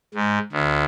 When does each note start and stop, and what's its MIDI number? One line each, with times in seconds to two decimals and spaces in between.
0.14 0.38 44
0.52 0.84 38